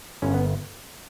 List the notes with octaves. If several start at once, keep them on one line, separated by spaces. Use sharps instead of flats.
G1 C#4
B3